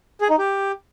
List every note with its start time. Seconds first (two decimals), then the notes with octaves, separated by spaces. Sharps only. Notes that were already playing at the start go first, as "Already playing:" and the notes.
0.21 G#4
0.30 D#4
0.39 G4